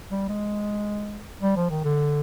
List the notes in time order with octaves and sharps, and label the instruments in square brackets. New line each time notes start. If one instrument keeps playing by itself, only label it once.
[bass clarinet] G3
G#3
G3
F3
D#3
D3